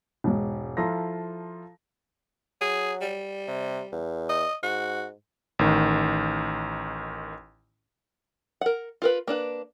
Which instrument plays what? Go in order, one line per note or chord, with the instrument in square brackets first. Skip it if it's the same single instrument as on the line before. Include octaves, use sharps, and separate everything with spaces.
[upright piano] E1 G#2
F3 E4 F4 A4 A#5 A#6
[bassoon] F#3 [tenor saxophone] G#4
[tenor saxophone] G3
[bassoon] C3
E2
[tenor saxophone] D#5
[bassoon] G#2 [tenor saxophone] F#4
[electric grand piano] A1 D#3
[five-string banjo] A#4 F#5
F4 A#4 B4
A#3 D4 B4